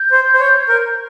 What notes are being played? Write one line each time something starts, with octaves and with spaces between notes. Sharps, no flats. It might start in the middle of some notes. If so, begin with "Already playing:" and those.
Already playing: G6
C5
C5
C#5
A#4